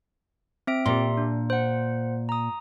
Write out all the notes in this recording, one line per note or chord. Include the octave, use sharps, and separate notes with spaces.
C4 E5 D7
A#2 G4 E5 C6
D4
C5 F#5
A#5 D#6